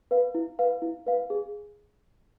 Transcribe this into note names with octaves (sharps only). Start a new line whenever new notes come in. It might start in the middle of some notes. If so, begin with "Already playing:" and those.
B4 F5
E4
B4 F5
E4
B4 F5
G#4